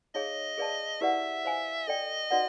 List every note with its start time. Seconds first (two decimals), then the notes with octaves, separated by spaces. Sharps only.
0.15 D#4 G#4 C#5 D#5 F5
0.58 G#4 B4 D5 F5 A5
1.01 E4 G4 B4 D5 E5 F#5
1.45 C5 F5 G#5
1.88 A4 D5 D#5 G5
2.31 D#4 F#4 B4 D5 F#5